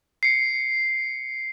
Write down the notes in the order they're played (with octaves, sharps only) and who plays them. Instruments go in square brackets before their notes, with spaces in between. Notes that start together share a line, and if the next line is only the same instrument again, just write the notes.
[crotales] C7 C#7